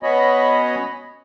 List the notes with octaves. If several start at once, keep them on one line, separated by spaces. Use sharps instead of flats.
B3 C#4 F#4 C#5 D#5 B5